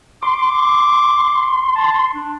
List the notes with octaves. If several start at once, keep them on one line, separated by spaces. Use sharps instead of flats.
C6 D6
A5
D4